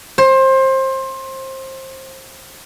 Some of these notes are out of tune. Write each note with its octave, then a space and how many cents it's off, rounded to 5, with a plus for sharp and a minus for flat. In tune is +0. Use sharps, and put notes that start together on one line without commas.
C5 +25